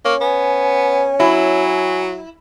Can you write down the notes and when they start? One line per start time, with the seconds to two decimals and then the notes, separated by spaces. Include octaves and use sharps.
0.05 A#3 C#4 C#6
0.21 B3 G#5
1.20 F#3 E4 G#5